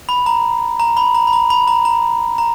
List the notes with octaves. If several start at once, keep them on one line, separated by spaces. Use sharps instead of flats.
B5
A#5
A#5
B5
A#5
B5
A#5
B5
A#5
A#5
A#5